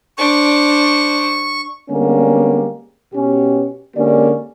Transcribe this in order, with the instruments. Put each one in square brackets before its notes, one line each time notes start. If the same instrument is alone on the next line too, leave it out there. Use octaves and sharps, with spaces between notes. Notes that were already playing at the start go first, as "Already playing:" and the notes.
[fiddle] D4 C5 [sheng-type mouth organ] C#6
[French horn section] D3 G3 G#3 A#3 B3 C#4
B2 C#4 G4
D3 G#3 A#3 C#4 G4 D5